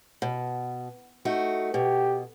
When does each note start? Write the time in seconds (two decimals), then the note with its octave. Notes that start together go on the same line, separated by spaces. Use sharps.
0.22 B2
1.25 A3 D#4 F#4
1.74 B2 G4